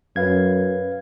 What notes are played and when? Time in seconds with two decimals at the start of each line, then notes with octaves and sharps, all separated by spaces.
0.16 F#2 B4 F5 G#6